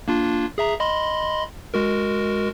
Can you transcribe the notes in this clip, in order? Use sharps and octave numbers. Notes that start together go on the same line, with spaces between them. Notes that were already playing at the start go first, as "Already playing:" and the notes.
A#3 D4 F4
G#4 E5 A#5
D#5 B5 C6
G#3 F#4 A#4